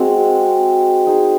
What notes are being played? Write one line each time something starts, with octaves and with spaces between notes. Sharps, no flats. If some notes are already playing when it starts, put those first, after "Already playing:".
Already playing: G#3 C4 F#4
D#4 G#4 C5